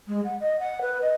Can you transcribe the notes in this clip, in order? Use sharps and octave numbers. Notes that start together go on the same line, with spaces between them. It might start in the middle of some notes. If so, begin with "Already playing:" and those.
G#3
F#5
D#5
F#5
B4
D#5